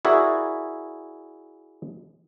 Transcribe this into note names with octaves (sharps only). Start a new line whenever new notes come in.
E4 F#4 G#4 A#4 D5 E5